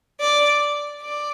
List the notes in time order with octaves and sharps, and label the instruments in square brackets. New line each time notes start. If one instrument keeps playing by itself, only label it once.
[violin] D5
D5